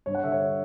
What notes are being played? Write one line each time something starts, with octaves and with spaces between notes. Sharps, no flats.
G2 C#5
F#5
D3 E5
C#5